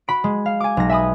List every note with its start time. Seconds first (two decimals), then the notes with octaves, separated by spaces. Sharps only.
0.08 F#4 B5 D7
0.24 G#3
0.46 F5
0.60 G#5 D6
0.77 B1 A#6
0.89 E5 G#5 B5 D#6